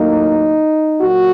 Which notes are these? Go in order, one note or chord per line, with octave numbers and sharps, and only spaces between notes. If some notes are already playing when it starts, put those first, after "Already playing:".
Already playing: A2 F#3 A#3 D#4
A#2 F#3 A#3 F#4